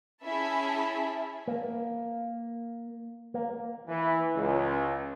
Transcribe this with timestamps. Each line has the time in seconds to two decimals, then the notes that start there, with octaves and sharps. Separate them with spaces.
0.24 C#4 E4 G#4 E5 A5 B5
1.48 A#3
3.34 A#3
3.86 E3
4.35 C#2